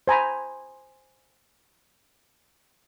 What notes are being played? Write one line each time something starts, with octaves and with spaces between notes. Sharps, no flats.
C5 G#5 A#5 B5